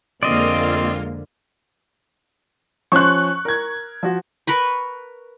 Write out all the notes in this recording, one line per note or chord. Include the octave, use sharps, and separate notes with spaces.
F2 D3 G#3 A#3 C4 F4 D5 D#5
F3 C#4 C5 C#6 F#6
A#4 G#6
F3 F#4
A#4 B4 B5 C#6